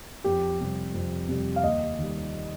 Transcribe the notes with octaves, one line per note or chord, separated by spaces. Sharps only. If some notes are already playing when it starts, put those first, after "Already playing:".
F2 G4
C3 G3
F2
C3 G3
F5
D#2 D#5
D#3 G3